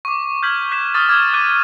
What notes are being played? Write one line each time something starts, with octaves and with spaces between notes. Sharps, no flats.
C#6 D6
F6 G6 G#6 B6 F#7
F#6 B6 E7
C#6 D#6 F6 A6
D6 F6 G#6
D6 F#6 D#7